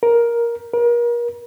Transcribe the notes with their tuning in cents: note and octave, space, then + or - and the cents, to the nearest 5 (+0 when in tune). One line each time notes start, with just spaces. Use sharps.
A#4 +10
A#4 +35